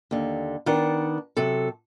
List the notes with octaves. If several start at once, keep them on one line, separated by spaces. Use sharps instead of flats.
D#2 D3
D#3 B3 D4 F#5
C3 F#3 A4